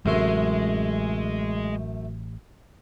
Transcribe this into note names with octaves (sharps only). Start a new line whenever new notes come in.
A1 F#2 C3 G#3 A3 C6